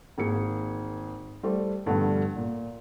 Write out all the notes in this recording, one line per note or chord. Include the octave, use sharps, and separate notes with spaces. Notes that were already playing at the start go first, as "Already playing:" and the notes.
G#1 A#3 G#4 C#7
G3 A3 C5 D5
A#1 G2 D3 G3 A3 B3
A#2